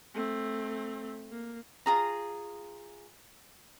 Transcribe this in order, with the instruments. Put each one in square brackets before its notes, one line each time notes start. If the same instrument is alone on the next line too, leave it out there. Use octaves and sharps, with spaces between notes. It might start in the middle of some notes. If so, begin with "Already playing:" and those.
[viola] A3 C4
A#3
[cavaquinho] F4 G#4 A#5